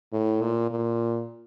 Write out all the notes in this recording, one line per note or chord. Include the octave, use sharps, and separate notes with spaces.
A2
A#2
A#2